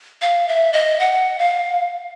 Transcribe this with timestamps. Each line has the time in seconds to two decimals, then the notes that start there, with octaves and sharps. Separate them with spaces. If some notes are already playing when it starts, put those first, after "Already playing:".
0.22 F5
0.48 E5
0.73 D#5
1.00 F#5
1.39 F5